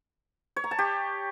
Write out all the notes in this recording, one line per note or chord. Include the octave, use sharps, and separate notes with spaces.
C#5
A#5
A5
G4